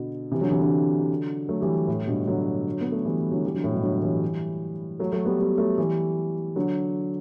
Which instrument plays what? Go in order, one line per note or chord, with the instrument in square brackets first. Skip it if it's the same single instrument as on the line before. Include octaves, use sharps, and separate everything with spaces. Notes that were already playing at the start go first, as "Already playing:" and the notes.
Already playing: [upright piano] B2 D3
C3 E3
D3 F#3
C3 E3
D3 F#3
F#3 A3
E3 G3
A2
G2 B2
D3 F#3
B3
A3
E3 G3
D3 F#3
E3 G3
D3 F#3
A2
G2 B2
D3 F#3
E3 G3
F#3 A3
F#3 A3
G3 B3
G3 B3
F#3 A3
E3 G3
D3 F#3